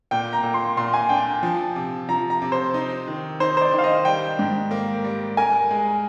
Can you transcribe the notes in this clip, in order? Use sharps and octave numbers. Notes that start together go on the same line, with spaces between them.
A#2 G5
A#5
A#2
C6
A#2 C6
G#5
D4 G5
F3
C3
F3 A#5
A#5
C3
C5
D#4
D#3
D#4 C5
C5
D5
D#3
F5
D#5
G3 G5
G#2
A#3
G3
A#4 G#5
G#3